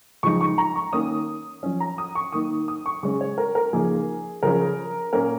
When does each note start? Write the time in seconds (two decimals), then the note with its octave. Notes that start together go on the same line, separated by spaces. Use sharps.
0.23 C#3 F3 G#3 D#4 C#6
0.41 C#6
0.58 A#5
0.76 C#6
0.93 D#3 A#3 C#4 D#6
1.63 F3 C#4
1.80 A#5
1.98 D#6
2.15 C#6
2.32 D#3 A#3 D#4 D#6
2.68 D#6
2.86 C#6
3.03 C#3 G#3 C#4 C#6
3.21 C#5
3.38 A#4
3.55 A#4
3.73 C#3 F3 A#3 D#4 G#4
4.43 C#3 F3 C#4 A#4
5.13 A#2 A#3 C#4 A#4